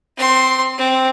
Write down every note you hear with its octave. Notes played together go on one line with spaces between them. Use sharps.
C4 C6
C4